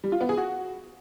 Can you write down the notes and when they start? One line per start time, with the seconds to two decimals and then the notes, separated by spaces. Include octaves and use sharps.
0.04 G3
0.12 F4
0.21 B3
0.29 G#4
0.38 F#4